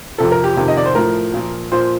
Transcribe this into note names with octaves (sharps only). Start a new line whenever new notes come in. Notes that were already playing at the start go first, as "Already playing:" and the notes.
F2 C3 F3 A4
A#4
G4
F2 C3 D#3
D#5
D5
C5
A2 F3 A#4
A#2 F3
A#2 F3 C5